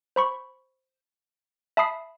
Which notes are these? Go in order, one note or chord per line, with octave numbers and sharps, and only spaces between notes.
C5 B5 C#6
E5 A5 B5 D#6 C7